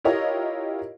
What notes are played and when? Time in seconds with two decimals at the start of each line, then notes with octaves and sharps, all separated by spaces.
0.04 E4 F4 G4 A#4 C#5 D#5